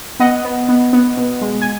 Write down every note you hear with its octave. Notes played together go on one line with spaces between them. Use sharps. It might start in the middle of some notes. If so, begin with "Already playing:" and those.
B3 D#5 F#5
B3
B3
B3
B2
G#3
G#5